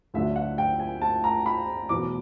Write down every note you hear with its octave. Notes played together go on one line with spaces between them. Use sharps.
D2 D3 F#3 E5
F#5
G5
G#5
A5
A#5
B5
E2 B2 F#3 B3 D6